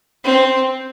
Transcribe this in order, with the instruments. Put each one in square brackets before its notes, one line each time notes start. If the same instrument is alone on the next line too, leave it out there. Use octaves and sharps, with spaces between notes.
[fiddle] C4